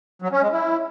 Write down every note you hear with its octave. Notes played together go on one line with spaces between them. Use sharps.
F#3
C#4
G#3
E4